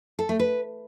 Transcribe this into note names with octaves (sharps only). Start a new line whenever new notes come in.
A4
A3
B4